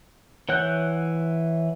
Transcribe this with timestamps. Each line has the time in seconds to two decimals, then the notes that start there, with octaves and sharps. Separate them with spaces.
0.49 E3 C#5 F#5 F#6 G6